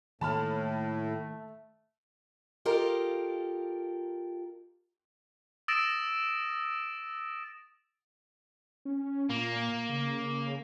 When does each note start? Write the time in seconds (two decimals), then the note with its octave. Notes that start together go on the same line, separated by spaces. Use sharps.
0.21 A2 D#3 A3 A#3 A5 B5 F6
2.65 F4 G4 A4 A#4 D#5 F5
5.68 D#6 E6 A6 A#6 D7 E7
8.85 C#4
9.29 A#2 A#3
9.89 C#3